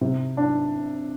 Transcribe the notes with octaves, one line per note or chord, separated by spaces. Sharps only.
C3
D4